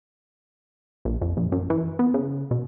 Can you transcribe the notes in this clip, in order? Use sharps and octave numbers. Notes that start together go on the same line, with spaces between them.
A#1
F2
A#1
F#2
E3
B3
C#3
B2